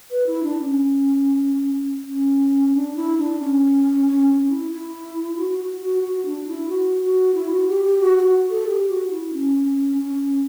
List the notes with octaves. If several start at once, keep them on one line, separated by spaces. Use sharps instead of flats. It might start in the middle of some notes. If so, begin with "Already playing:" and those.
B4
E4
D4
C#4
C#4
D4
E4
D4
C#4
C#4
C#4
E4
E4
F#4
F#4
F#4
F#4
D4
E4
F#4
F#4
E4
F#4
G4
G4
F#4
F#4
A4
G4
F#4
E4
C#4
C#4
C#4